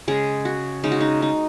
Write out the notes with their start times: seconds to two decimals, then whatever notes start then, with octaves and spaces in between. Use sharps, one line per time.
0.08 C#3 G#3 G#4
0.45 F#4
0.84 C#3 G#3 D#4
0.92 F#4
1.01 D#4
1.22 D#4